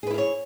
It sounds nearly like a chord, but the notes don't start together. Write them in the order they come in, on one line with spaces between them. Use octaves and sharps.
G#4 B4 E4 A#4 C#5